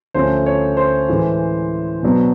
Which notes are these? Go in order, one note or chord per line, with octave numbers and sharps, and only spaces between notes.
D2 C#3 F3 A3 C#4 C5
C#5
C5
A2 E3 G#3
B2 F#3 B3 D4